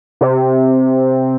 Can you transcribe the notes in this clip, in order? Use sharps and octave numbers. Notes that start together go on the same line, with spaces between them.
C3